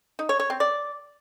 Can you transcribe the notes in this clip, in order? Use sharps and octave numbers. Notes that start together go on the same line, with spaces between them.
D#4
C#5
C#5
C4
D5